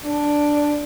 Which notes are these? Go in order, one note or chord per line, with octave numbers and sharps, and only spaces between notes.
D4